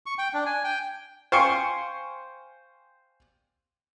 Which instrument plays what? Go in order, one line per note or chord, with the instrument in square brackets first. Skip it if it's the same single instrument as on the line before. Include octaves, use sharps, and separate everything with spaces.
[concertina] C#6
G5
D4
G#5
G5
[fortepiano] C5 F5 G5 G#5 C6 C#6